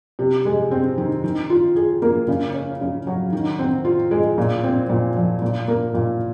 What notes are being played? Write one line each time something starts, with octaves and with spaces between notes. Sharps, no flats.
C3
G#3
C4
D#3
D#3
F4
G#4
A#3
C#3
C#4
C#3
F#3
D#3
C4
F4
G#3
A#2
C4
A#2
F3
A#2
A#3
A#2